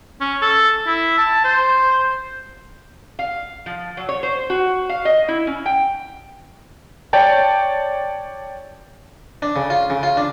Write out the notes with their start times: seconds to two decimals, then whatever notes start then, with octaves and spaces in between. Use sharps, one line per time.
0.21 C#4
0.42 A4
0.87 E4
1.18 A5
1.45 C5
3.19 F5
3.66 F3
3.97 F#3
4.09 C#5
4.23 C5
4.50 F#4
4.89 F5
5.05 D#5
5.28 E4
5.47 C#4
5.66 G5
7.13 C#5 D5 G5 A5
9.42 D4
9.56 C#3
9.70 F4
9.90 C#3
10.03 F4
10.17 D4